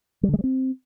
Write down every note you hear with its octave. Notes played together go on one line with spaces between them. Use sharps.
G3
D3
G#3
G3
C4